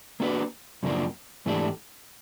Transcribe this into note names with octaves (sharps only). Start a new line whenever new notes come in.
A#3 D4 F#4 B4
F#2 C#3 F3 A#3 D4
G#2 E3 A3 D4 G4